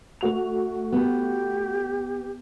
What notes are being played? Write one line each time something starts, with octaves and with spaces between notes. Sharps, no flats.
A3 F#4 F7
B3 G4